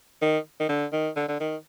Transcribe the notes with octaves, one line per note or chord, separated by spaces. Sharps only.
D#3
D#3
D3
D#3
D3
D3
D#3